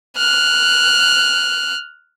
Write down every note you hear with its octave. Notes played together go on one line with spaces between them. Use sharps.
F6 F#6